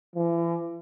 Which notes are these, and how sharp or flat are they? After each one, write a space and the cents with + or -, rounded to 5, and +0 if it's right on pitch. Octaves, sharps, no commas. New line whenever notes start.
E3 +40